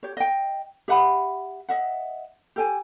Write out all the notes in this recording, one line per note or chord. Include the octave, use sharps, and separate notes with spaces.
G4 C#5
D#5 G5
G4 E5 F#5 B5
D#5 E5 F#5
G4 A4 G5 G#5